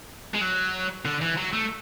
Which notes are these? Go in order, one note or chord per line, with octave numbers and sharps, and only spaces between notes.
G#3
F#3
D3
E3
F#3
A3